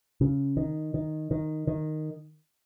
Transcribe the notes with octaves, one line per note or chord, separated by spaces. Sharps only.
C#3
D#3
D#3
D#3
D#3